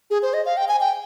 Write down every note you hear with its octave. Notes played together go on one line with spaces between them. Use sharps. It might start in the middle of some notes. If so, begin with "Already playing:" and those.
G#4
C5
D#5
F5
G5
G#5
G5